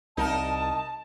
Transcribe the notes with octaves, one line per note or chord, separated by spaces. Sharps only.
C2 D#4 A#4 A5